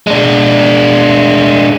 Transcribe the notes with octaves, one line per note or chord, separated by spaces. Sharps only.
G#3 D4